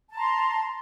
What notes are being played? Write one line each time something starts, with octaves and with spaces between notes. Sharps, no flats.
A5 A#5 C6